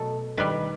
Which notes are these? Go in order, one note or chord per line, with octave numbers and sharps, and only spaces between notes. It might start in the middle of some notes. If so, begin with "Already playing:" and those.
Already playing: B2 F#3 A3 A4
D#3 G3 B4